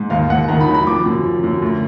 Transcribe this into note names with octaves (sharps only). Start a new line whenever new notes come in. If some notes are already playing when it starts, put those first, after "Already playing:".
Already playing: G#2
D#2 F5
D#2 F#5
D#3 A#5
B5
F#3
B5
F3 D6
F#2
F3
F#2
D2